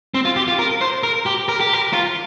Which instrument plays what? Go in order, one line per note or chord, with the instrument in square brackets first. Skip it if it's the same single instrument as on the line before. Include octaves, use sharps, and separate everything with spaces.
[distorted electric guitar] C4
F4
G4
F4
A#4
C5
A#4
G4
A#4
G4
A#4
F4